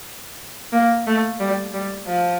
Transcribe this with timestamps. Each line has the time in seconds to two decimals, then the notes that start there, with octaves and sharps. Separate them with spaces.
0.72 A#3
1.07 A3
1.40 G3
1.73 G3
2.08 F3